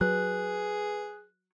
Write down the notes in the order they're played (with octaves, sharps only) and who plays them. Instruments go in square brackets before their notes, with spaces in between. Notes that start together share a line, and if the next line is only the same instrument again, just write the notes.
[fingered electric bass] F#3 [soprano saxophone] G#4 [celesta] B4 [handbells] F#6